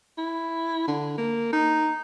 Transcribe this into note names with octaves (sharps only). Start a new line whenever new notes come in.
E4
D3
A#3
D#4